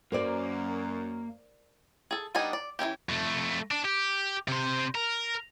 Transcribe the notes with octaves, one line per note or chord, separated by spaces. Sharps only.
F#2 A#3 A#4 C5 D5
G#4 A4
G3 B3 D4 D#4 G#5
D5
E3 A3 C#4 G4
F2 A3
D4
G4
C3 C5
A#4